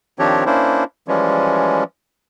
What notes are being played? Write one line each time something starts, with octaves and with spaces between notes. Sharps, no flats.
D#3 F3 C4 D4 G4 C#5
A#3 C#4 D4 E4 C5
E3 F3 G3 G#3 C#4